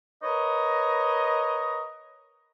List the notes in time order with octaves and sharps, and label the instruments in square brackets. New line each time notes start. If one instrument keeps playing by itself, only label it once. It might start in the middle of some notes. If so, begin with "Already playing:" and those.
[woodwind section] A#4 B4 C#5 D#5